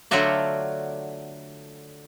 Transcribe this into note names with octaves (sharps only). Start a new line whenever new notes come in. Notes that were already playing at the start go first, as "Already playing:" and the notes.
D3 F#3 A3 F4 F#4 D5